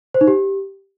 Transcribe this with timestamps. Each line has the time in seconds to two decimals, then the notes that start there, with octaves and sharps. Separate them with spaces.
0.14 C5
0.21 D#4
0.28 G4